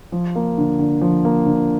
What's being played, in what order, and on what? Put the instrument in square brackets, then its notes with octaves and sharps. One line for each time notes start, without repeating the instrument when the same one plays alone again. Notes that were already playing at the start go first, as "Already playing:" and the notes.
[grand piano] F3
A#3
D3
D3
F3
A#3
D3